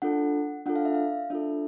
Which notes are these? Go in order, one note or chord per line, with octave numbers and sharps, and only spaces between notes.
D4 F4 A4 F#5
D4 F4 A4 F#5
F5
E5
F5
D4 F4 A4 E5